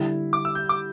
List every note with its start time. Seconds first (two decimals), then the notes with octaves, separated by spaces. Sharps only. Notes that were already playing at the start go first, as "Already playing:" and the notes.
Already playing: D3 G3 E4
0.33 D6
0.45 E6
0.55 G6
0.69 D6